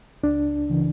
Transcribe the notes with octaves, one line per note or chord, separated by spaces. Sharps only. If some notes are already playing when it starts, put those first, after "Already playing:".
C#2 D4
C#3 E3